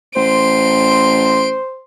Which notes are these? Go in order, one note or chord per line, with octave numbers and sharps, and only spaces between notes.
A1 C5 C6 D7